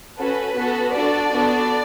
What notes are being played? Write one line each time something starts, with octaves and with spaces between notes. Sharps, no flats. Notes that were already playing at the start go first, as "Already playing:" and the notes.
C#4 F#4 A4 B4
B3 F#4 A4
D4 F#4 A4 D5
B3 D4 F#4 A4